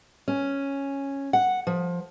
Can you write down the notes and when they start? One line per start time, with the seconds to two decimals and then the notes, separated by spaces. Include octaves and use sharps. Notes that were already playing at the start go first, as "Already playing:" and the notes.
0.28 C#4
1.33 F#5
1.67 F3